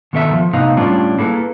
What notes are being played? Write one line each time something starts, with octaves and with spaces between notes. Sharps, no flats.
B2 D#3 B3 A4 C#5 E5
F3
A2 C3 B3 D#4 F5
A2 G3 C#4 D4 F4
A#3 E4 G#4 A4 B4